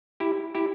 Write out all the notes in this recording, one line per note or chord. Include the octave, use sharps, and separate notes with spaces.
E4 G4
E4 G4